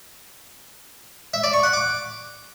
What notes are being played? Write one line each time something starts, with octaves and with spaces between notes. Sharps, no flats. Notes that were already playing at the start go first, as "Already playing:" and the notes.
E5
D5
C#6
F#5
D6